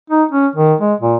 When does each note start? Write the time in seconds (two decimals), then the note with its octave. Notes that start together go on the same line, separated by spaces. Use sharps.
0.10 D#4
0.32 C#4
0.56 D#3
0.81 G#3
1.01 A#2